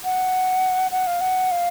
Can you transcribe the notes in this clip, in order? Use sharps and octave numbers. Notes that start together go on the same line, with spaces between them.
F#5
F#5
F5
F#5
F5